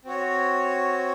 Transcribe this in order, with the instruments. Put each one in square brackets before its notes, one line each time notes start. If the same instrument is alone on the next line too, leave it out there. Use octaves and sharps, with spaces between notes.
[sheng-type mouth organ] C4 F#4 C#5